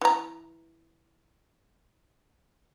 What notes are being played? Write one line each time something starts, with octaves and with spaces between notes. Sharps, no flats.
E3 A#5